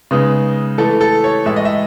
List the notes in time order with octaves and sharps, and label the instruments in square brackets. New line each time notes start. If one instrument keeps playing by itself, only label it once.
[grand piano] C#3 G#3 B3 D#4
E3 A3 E4 A4
A4
C#5
A2 E3 G#3 E5
D#5
E5